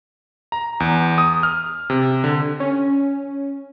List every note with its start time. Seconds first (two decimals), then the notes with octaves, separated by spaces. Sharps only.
0.52 A#5
0.80 E2
1.18 D#6
1.43 F6
1.90 C3
2.24 D3
2.60 C#4